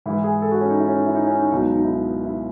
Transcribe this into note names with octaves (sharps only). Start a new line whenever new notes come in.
G#2 E3 E4
G#4
A4
F#4
C#4
D#4
E4
C#4
D#4
E4
D#4
C#4
D#4
C#2 B2 F#3 D#4
D#4
D#4
E4
D#4
E4